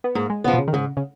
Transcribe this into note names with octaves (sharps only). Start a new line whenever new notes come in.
B3
G#2 A#3
G#3
C#3 F3 B3
B2
C#3
D#3
G#2 C#3
C#3